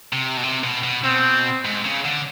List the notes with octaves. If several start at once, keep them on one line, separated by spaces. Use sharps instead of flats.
C3
B2
C3
B2
B2
B2 C4
G#2
C#3
D3